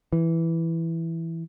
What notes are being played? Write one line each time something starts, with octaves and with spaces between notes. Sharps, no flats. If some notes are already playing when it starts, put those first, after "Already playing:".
E3